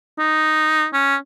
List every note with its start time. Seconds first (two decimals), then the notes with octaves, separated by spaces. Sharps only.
0.19 D#4
0.93 C#4